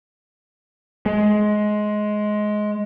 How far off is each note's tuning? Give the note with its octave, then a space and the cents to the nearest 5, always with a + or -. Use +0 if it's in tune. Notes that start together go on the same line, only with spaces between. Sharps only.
G#3 +15